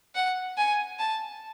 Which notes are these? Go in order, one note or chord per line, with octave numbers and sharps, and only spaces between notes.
F#5
G#5
A5